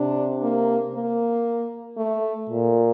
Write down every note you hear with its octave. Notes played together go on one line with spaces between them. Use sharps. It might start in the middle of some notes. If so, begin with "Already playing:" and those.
Already playing: C3 D4
A#3
A#3
A3
A#2